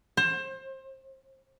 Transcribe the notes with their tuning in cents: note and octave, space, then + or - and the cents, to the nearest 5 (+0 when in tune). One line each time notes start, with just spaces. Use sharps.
C5 +25